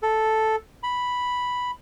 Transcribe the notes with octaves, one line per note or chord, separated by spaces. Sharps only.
A4
B5